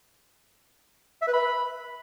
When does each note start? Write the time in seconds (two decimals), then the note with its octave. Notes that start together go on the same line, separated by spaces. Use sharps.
1.22 E5
1.28 B4
1.33 B5